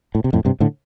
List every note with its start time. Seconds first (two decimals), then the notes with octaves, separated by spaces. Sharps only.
0.15 A2
0.24 C3
0.33 F2 A2
0.45 G2 C3
0.60 A2 D3